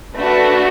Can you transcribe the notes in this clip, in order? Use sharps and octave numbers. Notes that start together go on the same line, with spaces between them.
A3 D4 F#4 B4